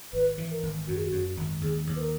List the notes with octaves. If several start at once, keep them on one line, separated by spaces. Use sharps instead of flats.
G#1 B4
E3
A#4
G#1
F#2 F#4
G#4
F#4
F#2
G#1
D#2 G#4
D#2
B4
A#4